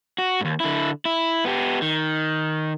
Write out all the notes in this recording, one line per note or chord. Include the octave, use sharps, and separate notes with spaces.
F#4
D#2 G#2
D3 E4
E4
B3 G4
D#3